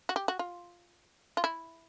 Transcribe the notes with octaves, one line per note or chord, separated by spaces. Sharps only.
F#4
G4
F#4
F4
F4
E4